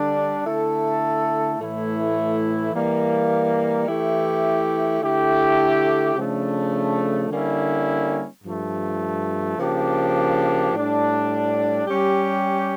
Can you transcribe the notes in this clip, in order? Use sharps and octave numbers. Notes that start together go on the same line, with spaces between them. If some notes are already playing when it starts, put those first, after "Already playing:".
Already playing: D3 G3 D4
D3 A3 E4 A4
A2 E3 A3 E4
E3 G3 A#3
E3 A3 E4 G4
D3 A3 E4 G4
C#3 F3 A3 D4
D3 G3 A#3 C#4 E4
G2 F3 A3
C#3 F3 A#3 D4 G4
A2 G3 D4
G3 C#4 G4